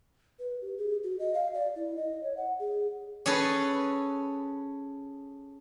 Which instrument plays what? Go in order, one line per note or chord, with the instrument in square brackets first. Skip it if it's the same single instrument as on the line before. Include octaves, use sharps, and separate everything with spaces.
[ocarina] B4
G4
G#4
F#4
D#5
F5
D5
E4
D#5
C#5
F#5
G#4
[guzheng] C#4 G#4 A4 B4